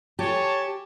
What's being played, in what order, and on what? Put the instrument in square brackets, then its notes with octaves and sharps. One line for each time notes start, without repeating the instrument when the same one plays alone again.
[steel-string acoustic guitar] G4 [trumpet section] C#5 G#5 A5